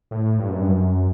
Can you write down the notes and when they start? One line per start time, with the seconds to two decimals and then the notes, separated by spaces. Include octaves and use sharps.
0.11 A2
0.38 G2
0.49 F#2
0.61 G2
0.68 F#2